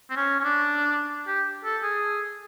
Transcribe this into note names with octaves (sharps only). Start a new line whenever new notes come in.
C4
C#4
C#4
D4
G4
A4
G#4